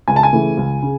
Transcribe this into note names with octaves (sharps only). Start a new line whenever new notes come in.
C#2 G#5
A5
G#5
C#3 E3 A3
C#2
C#3